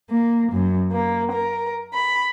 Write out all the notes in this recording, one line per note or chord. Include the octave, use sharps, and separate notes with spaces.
A#3
F#2
A#3
A#4
B5